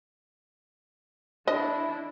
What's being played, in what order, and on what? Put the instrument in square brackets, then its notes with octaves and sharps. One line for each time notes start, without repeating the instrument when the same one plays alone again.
[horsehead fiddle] D4 E4 [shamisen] D#5